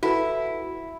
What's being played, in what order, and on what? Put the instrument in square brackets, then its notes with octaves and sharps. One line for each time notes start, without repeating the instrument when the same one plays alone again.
[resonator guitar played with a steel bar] E4 [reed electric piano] F#4 A4 B4